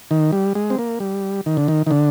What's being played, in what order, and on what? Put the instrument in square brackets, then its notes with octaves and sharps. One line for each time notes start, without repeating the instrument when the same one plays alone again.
[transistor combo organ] D#3
G3
G#3
C4
A#3
G3
D#3
D3
D#3
D#3
D3